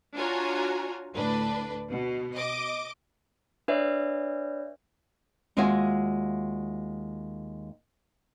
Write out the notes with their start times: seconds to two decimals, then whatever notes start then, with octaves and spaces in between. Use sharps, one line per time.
0.17 D4 F4 F#4 C#5 G#5 A#5
1.14 D2 A2 D4 B4
1.90 B2
2.33 D#5 D6
3.68 D4 B4 C#5 D5 E5
5.57 D#2 G#3 F4 F#4 E5 G#5